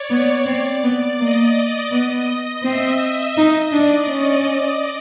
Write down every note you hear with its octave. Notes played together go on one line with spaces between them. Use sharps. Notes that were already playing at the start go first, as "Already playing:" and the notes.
Already playing: C#5 D5
B3
C4
B3
A#3 D#5
B3 D#5
D#5
C4 E5
D#4 D#5
D4 D5
C#4